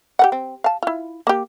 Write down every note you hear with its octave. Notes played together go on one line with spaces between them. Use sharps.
G4 B4 F#5
C4
F5 A5
E4 F4
A#3 G4